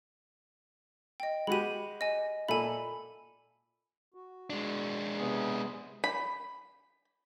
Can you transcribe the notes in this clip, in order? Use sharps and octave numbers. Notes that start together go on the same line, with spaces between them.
D#5 G5
G#3 F#4 G4 B5 D#7
D#5 G#5
A#2 A4 E5 G#5 B5
F#4
G#3 D4
C3 B3 G#4
B5